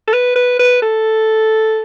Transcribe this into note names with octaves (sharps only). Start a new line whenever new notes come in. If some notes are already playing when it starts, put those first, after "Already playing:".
A4
B4
B4
B4
A4